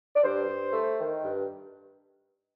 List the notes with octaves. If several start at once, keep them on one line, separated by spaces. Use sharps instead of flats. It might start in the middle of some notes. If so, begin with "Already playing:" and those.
D5
G2 C5
G2
A3
D#3
G2